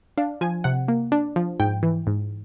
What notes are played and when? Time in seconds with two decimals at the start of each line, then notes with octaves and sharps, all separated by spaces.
0.18 D4 F5
0.41 F3 G#5
0.64 C3 F#5
0.88 A#3
1.12 D4
1.36 F3
1.60 G#2 G5
1.83 E3
2.07 G#2